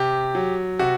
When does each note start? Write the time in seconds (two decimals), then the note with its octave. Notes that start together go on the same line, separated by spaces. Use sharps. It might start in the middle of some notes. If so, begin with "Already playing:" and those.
Already playing: C3 G4
0.35 F#3
0.79 C3 F#4